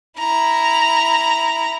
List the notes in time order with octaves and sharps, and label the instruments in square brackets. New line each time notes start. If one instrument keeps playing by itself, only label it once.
[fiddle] E4 A#5